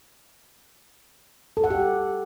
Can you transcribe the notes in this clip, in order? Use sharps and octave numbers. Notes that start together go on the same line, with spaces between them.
A4
F#5
G4